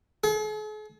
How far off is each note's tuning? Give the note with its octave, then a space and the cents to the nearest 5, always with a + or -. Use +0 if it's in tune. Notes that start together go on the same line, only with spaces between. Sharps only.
G#4 +45